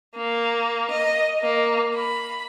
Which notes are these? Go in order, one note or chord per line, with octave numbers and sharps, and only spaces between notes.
A#3
D#5
A#3
B5